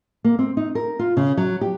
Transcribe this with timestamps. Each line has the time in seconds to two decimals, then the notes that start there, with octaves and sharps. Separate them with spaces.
0.24 A#3
0.39 C4
0.57 D#4
0.75 A#4
0.99 F4
1.17 C#3
1.37 F#3
1.61 G4